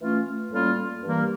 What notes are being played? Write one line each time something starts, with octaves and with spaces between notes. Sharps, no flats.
E3 A3 C#4 F4
A2 G3 A#3 C#4 F4
G2 E3 G3 A#3